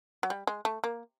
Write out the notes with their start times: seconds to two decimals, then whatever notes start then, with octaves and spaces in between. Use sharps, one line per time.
0.23 F#3
0.30 G3
0.47 G#3
0.65 A3
0.84 A#3